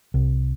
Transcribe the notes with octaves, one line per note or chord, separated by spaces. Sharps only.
C2